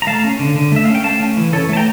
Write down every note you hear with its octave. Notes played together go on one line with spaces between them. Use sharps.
A#5
A3 F5 A5
C#4
D3
D3
A3 E5
C#4 F5
G5
A3 F5 A5
C#4
E3
E3 A4 C#5
A3 A5
G5 A#5